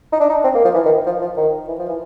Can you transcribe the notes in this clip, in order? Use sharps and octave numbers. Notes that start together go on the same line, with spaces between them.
D#4
D4
D#4
C4
A#3
F3
E3
D#3
F3
F3
D#3
E3
F3
E3